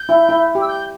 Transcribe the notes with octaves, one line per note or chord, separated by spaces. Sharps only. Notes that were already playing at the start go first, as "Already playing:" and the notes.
Already playing: G6
E4
E4
G4
E6
G6